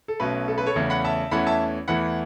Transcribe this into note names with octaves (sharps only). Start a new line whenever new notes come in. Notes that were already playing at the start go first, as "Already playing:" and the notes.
A4
B1 B2 A3 C#4 B4
A4
B4
A4 C#5
E2 C#3 A3 C#4
F#5 B5
E5 A5
E2 E3 A3 C#4 F#5 B5
E5 A5
E2 E3 A3 F#5 B5